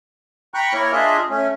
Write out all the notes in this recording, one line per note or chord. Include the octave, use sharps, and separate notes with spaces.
G5 A#5 B5 C#6 F#6
A#3 E4 A#4 C#5
D4 F4 G#4 D#5 E5
A3 C#4